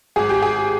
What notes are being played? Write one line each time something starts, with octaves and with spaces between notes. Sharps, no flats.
G#1 G#4
G4
G#4